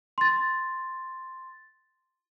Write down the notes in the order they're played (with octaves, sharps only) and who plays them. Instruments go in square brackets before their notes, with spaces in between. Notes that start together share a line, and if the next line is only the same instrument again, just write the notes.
[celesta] C6 A6